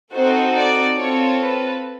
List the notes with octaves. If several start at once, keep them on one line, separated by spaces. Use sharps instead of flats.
C4 D#4 F#4 A4 C5
D5
C4 F4 A4 C#5
B4